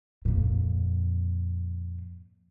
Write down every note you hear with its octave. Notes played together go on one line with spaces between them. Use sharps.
F2 A#2